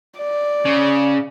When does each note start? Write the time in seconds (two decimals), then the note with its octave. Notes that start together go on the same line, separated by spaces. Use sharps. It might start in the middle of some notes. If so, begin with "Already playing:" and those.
0.18 D5
0.66 C#3